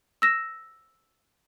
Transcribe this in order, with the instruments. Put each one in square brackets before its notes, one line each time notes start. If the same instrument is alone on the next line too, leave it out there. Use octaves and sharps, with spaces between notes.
[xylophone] E6 A#6 E7